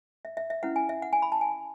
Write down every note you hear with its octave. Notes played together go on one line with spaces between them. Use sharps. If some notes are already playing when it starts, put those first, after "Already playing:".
E5
E5
E5
C#4 E4 B4 F#5
G#5
E5
F#5
G#5
B5
A5
G#5